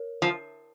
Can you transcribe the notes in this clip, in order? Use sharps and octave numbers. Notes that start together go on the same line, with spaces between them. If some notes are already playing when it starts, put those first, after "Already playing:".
Already playing: A#4 C#5
F3